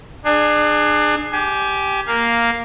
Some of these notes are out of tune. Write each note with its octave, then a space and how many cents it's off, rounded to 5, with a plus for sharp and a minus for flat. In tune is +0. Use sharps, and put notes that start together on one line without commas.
D4 +30 G#4 +0
G4 +0 G#5 +25
A#3 +0 F5 +0